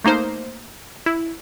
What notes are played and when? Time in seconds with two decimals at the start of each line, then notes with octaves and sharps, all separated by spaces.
0.04 A3 A#3 D#4 C5
1.06 E4